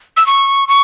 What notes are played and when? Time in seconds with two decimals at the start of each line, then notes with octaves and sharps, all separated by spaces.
0.16 E6
0.26 C#6
0.68 C#6